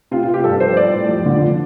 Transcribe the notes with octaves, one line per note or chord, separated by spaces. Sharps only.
C3 F4
F4
C3
G4
G2 A4
F3 C5
G3 D5
A2
F2
D3
F3